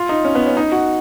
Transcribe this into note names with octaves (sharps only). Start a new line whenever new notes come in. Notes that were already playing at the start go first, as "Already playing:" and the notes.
Already playing: F4
D#4
C#4
B3
C#4
D#4
F#4